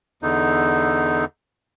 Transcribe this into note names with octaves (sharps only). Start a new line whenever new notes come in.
E2 D3 D#4